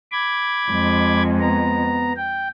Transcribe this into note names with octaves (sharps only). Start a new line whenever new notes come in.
B5 D6 G#6
F2 G#3
B3 A#5
G5